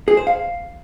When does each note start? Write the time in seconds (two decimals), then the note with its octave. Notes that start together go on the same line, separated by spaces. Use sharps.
0.08 G#4
0.17 C5
0.27 F5